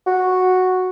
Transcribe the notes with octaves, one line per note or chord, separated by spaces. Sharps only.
F#4